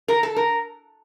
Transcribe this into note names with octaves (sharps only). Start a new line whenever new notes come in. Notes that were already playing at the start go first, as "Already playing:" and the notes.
A#4
A4
A#4